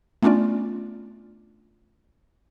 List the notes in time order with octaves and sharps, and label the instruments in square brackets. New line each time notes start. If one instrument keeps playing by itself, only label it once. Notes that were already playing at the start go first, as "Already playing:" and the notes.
[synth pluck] A3 B3 C#4 D4 F4 D5